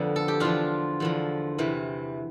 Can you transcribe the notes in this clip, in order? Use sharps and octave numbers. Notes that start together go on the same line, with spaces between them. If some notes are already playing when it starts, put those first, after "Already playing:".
Already playing: F2 D3 F3 B3 D4
A4
G4
E2 D3 F3 D4 F4
E2 D3 F3
E2 C3 E3